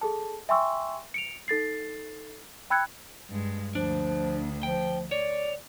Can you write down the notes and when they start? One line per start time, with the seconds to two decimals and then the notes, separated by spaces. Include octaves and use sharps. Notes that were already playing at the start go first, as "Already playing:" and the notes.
0.01 G#4 A4 A5
0.49 E5 G5 G#5 C6 C#6 E6
1.14 C#7 D7 F7
1.48 D#4 A4 A6 C7
2.70 G5 B5 E6 F#6 G#6 C#7
3.30 G2 G#3
3.75 D2 F3 D4
4.63 F3 G5
5.11 C#5 D5